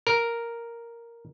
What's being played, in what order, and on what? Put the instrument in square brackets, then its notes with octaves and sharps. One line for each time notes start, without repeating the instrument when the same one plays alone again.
[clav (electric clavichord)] A#4